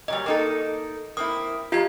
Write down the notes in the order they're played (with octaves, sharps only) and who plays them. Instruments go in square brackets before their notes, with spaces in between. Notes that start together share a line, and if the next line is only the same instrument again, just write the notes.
[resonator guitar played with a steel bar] A#2 F#3 G3 [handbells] D#5
[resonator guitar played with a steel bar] A#3 D#4 A4
[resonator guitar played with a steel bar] A#3 C4 E4 [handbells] D#6
[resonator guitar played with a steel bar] F2 F5 [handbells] F4 G4 G#6